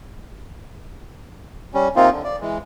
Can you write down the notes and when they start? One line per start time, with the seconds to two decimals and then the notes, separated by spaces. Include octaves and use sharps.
1.74 G3 C#4
1.96 C3 A#3 C4 D#4 F4
2.11 D3
2.24 D5
2.41 E3 G#3